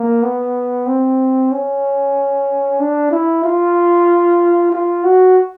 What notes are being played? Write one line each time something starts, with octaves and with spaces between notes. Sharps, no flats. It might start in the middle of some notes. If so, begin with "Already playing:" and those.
Already playing: A#3
B3
C4
C#4
D4
E4
F4
F4
F#4